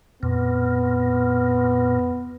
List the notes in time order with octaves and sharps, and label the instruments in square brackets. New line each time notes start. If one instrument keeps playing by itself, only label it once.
[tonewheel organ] F2 A#2 [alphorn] B3